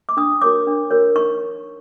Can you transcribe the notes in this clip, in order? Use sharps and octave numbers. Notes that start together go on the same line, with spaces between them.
D6
D4 D#6
F#4 A#4 C#5 D6
D4
F#4 A#4 C#5
D#4 C#6